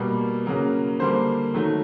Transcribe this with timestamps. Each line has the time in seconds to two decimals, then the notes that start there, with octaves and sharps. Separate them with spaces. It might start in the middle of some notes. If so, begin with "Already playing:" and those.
Already playing: B2 G3 A#3
0.46 C#3 F#3 A#3
0.99 D3 G3 A#3 C5
1.54 D#3 F#3 A3